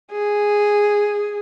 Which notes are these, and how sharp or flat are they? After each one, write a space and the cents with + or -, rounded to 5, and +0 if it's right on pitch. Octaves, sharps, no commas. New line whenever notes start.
G#4 -5